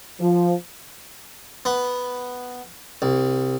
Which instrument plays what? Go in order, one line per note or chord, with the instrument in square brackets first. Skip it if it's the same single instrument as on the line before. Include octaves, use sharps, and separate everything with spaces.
[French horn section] F3
[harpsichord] B3
C2